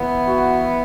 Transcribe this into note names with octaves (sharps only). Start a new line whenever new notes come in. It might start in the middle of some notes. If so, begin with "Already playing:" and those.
Already playing: E3 B3 E4
F#4